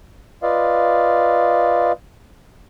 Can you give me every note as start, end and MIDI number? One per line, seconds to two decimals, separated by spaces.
0.43 1.92 65
0.43 1.92 71
0.43 1.92 74
0.43 1.92 75
0.43 1.92 77